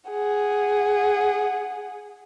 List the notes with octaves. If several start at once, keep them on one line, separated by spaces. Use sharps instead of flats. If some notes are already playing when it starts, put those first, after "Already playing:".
G#4 F#5